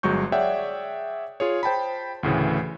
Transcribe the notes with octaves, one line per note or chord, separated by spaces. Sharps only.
G1 F#3 G#3 C#6 G6
G#4 C#5 D5 E5 F#5 G5
F4 G#4 C#5
C5 G5 A5 B5
D2 A2 C#3 E3